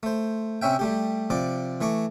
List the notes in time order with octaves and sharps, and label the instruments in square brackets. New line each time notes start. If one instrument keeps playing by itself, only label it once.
[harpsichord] A3 C5
C3 C4 C#4 E5 G5
G3 A3 G4
C3 F3 D5 D6
E3 A3 C#6 D6